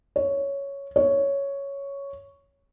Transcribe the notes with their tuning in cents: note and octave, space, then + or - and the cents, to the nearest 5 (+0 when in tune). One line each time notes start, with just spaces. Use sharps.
C#5 +5
C#5 +5